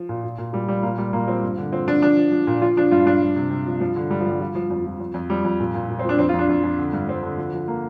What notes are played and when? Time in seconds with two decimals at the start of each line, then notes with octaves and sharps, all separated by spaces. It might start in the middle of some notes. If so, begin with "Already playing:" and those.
Already playing: F3
0.09 A#2
0.24 A#2
0.38 A#2
0.53 A#2 G3
0.68 F3 G3
0.83 A#2 A#3
0.98 A#2 G3
1.13 A#2 A#3
1.27 F3 C4
1.42 G2
1.58 D3
1.72 F3 C4
1.88 F3 D4
2.02 F3 D4
2.17 F3
2.32 F3
2.47 A#2
2.62 F3 F4
2.77 F3 D4
2.91 G2 F4
3.06 G2 D4
3.21 F3
3.36 C3
3.50 C3
3.66 F3
3.80 G2 F3
3.96 D3
4.10 G2 G3
4.20 F3
4.26 G2 G3
4.40 F3 G3
4.55 F3
4.70 F2 F3
4.86 F3
5.00 F2
5.14 F2
5.30 F3 G3
5.45 F2
5.60 A#2
5.74 A#2
5.89 A#2
5.99 C4
6.04 F3 D4
6.19 F2 C4
6.29 F4
6.34 F2
6.39 D4
6.49 F2 F4
6.64 F2
6.79 D3
6.93 G2
7.08 G2 C4
7.23 D3
7.37 F3
7.53 F3
7.68 A#3